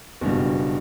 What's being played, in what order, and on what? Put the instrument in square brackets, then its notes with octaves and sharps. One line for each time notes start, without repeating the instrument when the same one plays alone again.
[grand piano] F#1 G2 B2